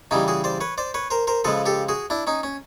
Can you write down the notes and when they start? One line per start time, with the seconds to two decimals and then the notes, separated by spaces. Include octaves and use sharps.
0.11 C#3 E3 G3 C#4 D#4
0.28 F#4 G#4
0.44 C5 D5
0.61 B4 C#5
0.78 C5 D5
0.94 B4 C#5
1.10 A#4 C5
1.27 A#4 C5
1.44 C#3 F3 G#3 A4 B4
1.66 G4 A4
1.89 F#4 G#4
2.10 D4 E4
2.27 C#4 D#4
2.43 C#4